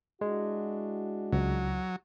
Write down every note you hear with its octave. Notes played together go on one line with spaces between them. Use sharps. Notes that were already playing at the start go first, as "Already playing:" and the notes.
G#3 D4 E4 F#4
C#2 F#3